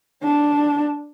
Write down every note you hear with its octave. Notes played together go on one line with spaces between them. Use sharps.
D4